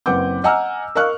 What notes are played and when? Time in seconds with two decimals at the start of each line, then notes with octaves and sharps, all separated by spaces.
0.06 F#1 C4 B4 F#5 D6 G6
0.44 D#5 F#5 G#5 A#5 E6 F6
0.95 A#4 D#5 F5 C#6 F6 F#6